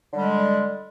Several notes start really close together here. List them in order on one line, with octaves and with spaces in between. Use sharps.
D3 G3 G#3